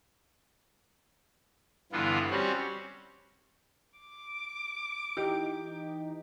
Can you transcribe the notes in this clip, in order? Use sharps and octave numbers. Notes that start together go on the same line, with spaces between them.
G2 D3 E3 B3 F4
G3 C4 C#4 F#4
D6
E3 D#4 G4